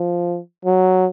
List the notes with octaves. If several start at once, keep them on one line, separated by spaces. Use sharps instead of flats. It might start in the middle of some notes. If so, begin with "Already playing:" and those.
Already playing: F3
F#3